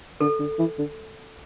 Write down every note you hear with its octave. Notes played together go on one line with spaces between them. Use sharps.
D3 A4
D3
E3
D3